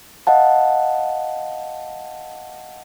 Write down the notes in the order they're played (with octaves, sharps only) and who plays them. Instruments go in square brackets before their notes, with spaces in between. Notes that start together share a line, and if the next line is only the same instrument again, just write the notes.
[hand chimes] D#5 F5 F#5 A5